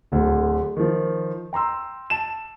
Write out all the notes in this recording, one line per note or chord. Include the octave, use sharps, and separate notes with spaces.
D1 D2
D#3 F3
G5 A#5 C6 E6
A5 E7